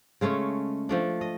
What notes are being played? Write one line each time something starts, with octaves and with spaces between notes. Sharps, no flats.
C#3 G#3 A3 C#4
F3 A3 D4
D#5